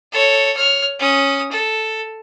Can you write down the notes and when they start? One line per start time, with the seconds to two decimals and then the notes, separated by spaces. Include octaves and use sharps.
0.12 A4 C#5
0.56 C#5 F6
0.99 C#4 D#6
1.52 A4